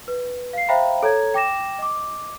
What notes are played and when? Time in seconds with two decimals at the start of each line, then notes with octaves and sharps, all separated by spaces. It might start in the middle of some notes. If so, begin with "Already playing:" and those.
0.08 B4
0.53 F5 C7
0.69 C5 E5 F5 G5 A#5 B5
1.03 A4 C#5 A#5 G#6
1.34 G5 D6 A#6 E7
1.79 D#5 D6